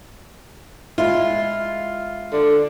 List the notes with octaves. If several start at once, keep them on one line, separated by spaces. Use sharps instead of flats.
G#3 E4 F4
D3